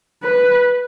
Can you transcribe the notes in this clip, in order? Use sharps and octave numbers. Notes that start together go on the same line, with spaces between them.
B4